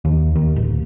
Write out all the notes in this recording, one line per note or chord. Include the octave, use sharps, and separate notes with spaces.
D#2
D#2
D1